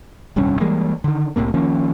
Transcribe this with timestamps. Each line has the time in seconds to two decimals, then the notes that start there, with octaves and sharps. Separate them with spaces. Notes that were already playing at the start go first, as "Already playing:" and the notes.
0.36 D#1 C2 G2 C#4
0.60 E3 G3 G#3 A#3
1.04 D3 D#3
1.36 C2 A2 C3 A#3
1.54 D#3 F3 A#3 C#4